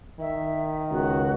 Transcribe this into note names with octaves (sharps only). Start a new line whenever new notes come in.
D#3 E5
C#2 F#4